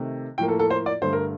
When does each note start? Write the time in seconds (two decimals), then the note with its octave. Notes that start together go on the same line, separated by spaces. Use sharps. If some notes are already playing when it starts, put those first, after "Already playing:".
Already playing: C3 D#3 A3
0.38 A2 F3 A#3 G5
0.48 A4
0.59 A4
0.70 C5
0.86 D5
1.02 G2 D3 A3 C5
1.13 A#4